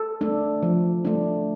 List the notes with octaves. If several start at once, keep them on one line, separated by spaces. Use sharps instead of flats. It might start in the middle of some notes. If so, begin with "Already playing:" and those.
Already playing: A4
A3 D4
F3
A3 D4